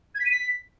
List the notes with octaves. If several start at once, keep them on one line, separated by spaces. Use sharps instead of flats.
G#6
B6
D#7
B6